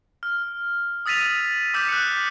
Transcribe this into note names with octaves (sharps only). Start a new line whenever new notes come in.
F6
D#6 E6 A6 B6 D#7 F7
D6 E6 G6 B6 E7
F#6 C#7